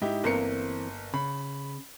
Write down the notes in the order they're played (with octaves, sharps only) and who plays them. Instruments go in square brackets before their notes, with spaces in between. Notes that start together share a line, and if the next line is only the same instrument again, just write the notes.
[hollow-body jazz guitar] G#2 [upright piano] D#4 E4 G4
[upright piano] G1 A#3 C#7 [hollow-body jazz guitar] E3 C4 A#4
[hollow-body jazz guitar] C#3 [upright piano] B5